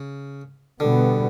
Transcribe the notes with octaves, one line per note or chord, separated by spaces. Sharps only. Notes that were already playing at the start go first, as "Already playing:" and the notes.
Already playing: C#3
B2 D3 G3 B3